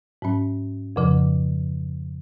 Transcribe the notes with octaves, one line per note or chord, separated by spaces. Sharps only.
G#2 F#3 C#4
F2 C#3 F3